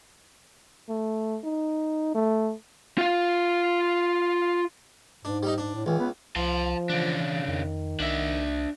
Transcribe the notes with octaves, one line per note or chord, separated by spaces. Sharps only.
A3
D#4
A3
F4 F5
G#2 D4
G3 D#4
D4
A2
C#2 E3
B3
C2 F3 A5 C6
C#3 E3 D4
F2 D#3
C2 D4 E5